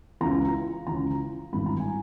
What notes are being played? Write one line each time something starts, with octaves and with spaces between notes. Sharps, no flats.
C#2 C#3 E3 A#5
C#2 C#3 E3 A#5
G#1 G2 E3 G3 B5
A#5
G#5